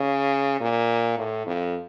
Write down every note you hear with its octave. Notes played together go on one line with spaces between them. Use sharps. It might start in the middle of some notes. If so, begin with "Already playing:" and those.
Already playing: C#3
A#2
A2
F2